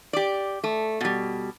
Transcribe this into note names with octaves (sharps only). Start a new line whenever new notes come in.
G4 D5
A3
B2 G3